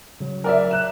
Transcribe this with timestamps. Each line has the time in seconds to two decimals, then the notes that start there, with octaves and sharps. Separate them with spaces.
0.20 C#3 F#3
0.44 A#4 D5 E5
0.71 F#6 E7